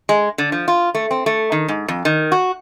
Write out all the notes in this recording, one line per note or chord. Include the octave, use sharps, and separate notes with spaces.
G#3
D3
F3
F4
A3
C4
A3
D#3
G#2
F2
D#3
F#4